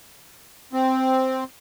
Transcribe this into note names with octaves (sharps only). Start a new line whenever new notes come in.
C4